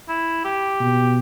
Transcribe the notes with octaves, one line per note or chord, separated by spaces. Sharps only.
E4
G4
B2